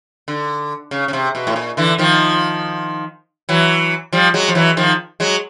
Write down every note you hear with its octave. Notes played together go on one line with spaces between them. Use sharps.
D3
C#3
C#3
C3
B2
A2
A#2
D3 E3
D#3 F3
E3 F#3
F3 G3
F#3 G#3
F3
E3 F#3
D#3 F3
F#3 G#3